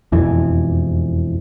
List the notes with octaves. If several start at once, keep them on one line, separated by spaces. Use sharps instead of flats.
E1 F2 E3